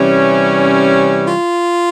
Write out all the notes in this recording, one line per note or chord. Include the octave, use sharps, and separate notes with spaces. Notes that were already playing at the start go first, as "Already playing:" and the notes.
Already playing: C3 E3 G3 C#4
F4